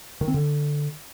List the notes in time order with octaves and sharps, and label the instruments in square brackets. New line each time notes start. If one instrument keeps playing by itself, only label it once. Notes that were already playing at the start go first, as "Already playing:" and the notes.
[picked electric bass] D#3
C4
D3